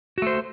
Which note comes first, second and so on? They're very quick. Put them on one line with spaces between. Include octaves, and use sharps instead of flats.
F#4 A3 C5